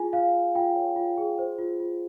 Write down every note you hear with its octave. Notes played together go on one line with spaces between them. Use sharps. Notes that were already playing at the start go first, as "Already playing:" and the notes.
Already playing: F4 G#4 G#5
F4 F5
F4
F4 G5
C#5
F4
G#4
C5
F4
F4